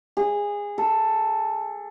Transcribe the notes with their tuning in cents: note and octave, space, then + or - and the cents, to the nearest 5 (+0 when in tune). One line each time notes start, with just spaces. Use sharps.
G#4 -20
A4 +5